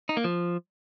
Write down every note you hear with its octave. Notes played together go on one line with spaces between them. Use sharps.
D#4
A#3
F3